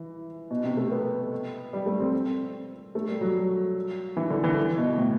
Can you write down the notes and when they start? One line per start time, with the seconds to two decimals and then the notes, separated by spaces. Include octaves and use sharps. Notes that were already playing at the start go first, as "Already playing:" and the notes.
Already playing: E3
0.51 B2
0.64 C3
0.77 A3
0.92 B3
1.73 G3
1.86 A3
2.00 C4
2.13 C4
2.95 A3
3.09 G3
3.21 F#3
4.17 E3
4.30 D3
4.44 E3
4.78 B2
4.98 A2